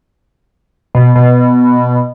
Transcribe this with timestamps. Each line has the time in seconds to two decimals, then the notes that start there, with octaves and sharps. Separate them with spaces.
0.95 B2
1.15 B2